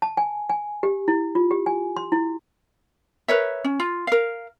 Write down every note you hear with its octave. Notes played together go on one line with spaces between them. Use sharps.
A5
G#5
G#5
G4
E4
F4
G4
G#5
C6
E4
A#4 B4 C#5 E5
C#4
F4
A#4 F5